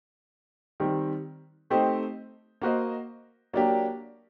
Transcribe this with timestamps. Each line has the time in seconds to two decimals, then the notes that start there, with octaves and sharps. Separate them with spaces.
0.80 D#3 G3 C4
1.70 A3 C4 D#4 G4 C5
2.61 A#3 F#4 C5 D#5
3.53 F#3 A#3 D4 G4